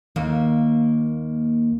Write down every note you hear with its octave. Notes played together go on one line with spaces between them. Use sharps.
D#2 A#3